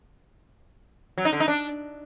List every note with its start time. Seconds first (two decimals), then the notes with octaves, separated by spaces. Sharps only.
1.18 F#3
1.25 D#4
1.33 D3
1.40 D#4
1.48 D4